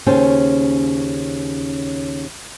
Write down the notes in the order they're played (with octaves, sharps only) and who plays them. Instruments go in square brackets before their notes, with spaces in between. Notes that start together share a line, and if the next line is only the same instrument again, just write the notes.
[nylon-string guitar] D#2 C#3 C#4 C5 G5 A5